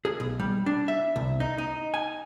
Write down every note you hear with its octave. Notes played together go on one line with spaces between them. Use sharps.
G#4
B1
G3
D4
E5
C2
D#4
D#4
G#5